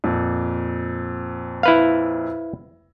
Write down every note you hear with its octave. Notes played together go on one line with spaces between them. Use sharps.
F2 A#2
E4 B4 F5